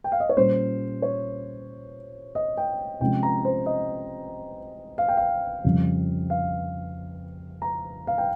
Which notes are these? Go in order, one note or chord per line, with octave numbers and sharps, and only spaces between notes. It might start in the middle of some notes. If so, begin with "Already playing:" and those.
G5
F5
D#5
C#5
A#2 G3 C#4 C5
C#5
D#5
G5
C3 F3 G#3 C#4 G5
A#5
C5
D#5
F5
G5
F5
F2 C#3 G3
F5
A#5
F5
G5